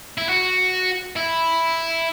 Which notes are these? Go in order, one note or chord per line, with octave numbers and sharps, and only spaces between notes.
E4
F#4
E4